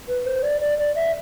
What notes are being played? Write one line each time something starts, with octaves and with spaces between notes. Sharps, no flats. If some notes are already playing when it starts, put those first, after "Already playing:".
B4
C5
D5
D5
D5
E5